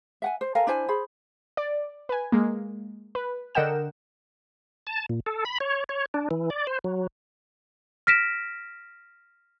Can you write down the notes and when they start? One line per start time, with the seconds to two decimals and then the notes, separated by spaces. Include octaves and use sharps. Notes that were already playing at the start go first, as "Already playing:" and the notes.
0.22 E5 F#5 G#5
0.41 C5
0.55 A4 A#4 F5 G#5
0.67 D4 E4 C5 G#5
0.88 G#4 C5 B5
1.57 D5
2.09 B4 G#5
2.32 G#3 A#3
3.15 B4
3.55 D3 A#4 D#5 F#5 G5 E7
4.87 A5
5.10 A#2
5.27 A4
5.45 B5
5.60 C#5
5.89 C#5
6.14 D4
6.31 E3
6.50 D5
6.67 C5
6.84 F#3
8.07 F6 A#6 B6 D7 E7